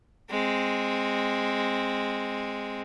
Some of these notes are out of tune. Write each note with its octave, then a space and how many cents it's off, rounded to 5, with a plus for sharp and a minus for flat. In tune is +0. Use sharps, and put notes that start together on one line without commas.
G#3 -10 C4 +0